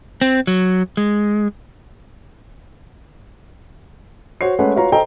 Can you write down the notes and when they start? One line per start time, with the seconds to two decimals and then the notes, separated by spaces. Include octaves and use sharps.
0.21 C4
0.47 F#3
0.97 G#3
4.41 F#4 C5 C#5 C7
4.59 G#3 A3 C#4 B4 C#5 F#5
4.76 F4 F#4 B4 C#5 F5 A#5
4.92 A4 C5 D#5 G5 A#5